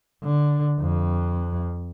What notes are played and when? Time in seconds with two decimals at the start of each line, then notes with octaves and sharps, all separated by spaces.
0.23 D3
0.80 F2